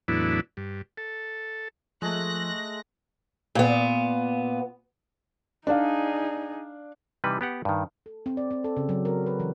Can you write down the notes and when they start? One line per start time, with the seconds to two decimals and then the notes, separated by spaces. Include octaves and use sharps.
0.08 E2 A2 F#3 B3 D4 E4
0.57 G2
0.97 A4
2.02 F3 G#3 A3 F#6 A#6
3.55 A#2 B3
5.67 D4 D#4 G#4 D5 F5
7.24 C3 E3 G3 D#4 B4
7.41 B3 G4 F#5
7.65 G2 D#3
8.06 A4
8.26 C4
8.37 D5
8.51 C4
8.64 A4
8.77 C#3
8.89 F#3
9.05 A#4
9.26 B4
9.40 E3